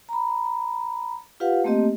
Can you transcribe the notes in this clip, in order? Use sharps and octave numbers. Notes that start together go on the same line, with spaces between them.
A#5 B5
F4 G4 B4 F5 F#5
A3 A#3 C4 G4 D#5